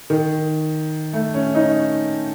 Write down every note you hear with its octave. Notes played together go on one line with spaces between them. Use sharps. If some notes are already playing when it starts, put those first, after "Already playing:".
D#3
A3
C#4
D#4